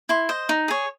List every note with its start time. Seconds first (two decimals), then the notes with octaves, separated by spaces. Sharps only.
0.09 E4 C6
0.29 C5 D#5
0.49 D#4
0.68 G#4 C#5